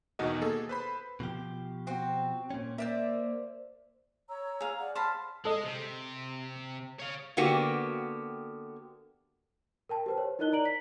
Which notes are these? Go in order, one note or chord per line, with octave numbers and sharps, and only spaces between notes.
E2 B2 D#3 F#4 D#5
A#3 G#4 A4
B4 C5 B5
B2 F3 G4
C4 F#4
A#2 C#4
A#3 C5 D5 E5
C#5 A#5 E6
G#4 F5
D5 F#5
C5 A5 B5 F6
G#3 A4 D#5
C3
C#5 F5
D3 A#3 B3 F#4 G4
A#4 G5 A5
G4 B4 C5
C#5
D#4 E4 A#4 D#5 F#6 G7
D5 A#5 D7 F#7
B6